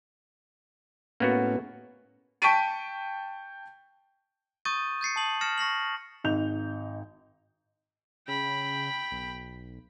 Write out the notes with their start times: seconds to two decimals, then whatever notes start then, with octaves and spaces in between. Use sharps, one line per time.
1.20 A2 A#3 B3 C#4 F#4
2.42 G5 A5 C#6 B6 D7 D#7
4.65 C#6 D#6 G6 A6 D#7
5.01 G6 A6 C7 C#7
5.16 A5 D#6 F#7
5.41 F6 A6 A#6 C#7 E7
5.58 C#6 A#6 C7 F#7
6.24 G#1 D#4 G6 F7
8.28 C#3 G5 B5
9.12 B1